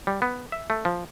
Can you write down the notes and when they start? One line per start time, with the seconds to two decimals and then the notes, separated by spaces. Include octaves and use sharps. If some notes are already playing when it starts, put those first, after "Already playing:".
0.07 G3
0.22 B3
0.52 E5
0.70 A3
0.85 F3